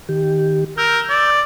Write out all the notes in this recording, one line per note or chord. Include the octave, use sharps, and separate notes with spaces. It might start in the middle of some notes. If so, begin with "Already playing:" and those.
D#3 G4
A#4 E6 G6
D5